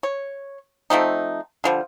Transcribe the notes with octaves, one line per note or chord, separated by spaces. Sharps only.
C#5
F3 A3 C4 D#4
D3 F3 G3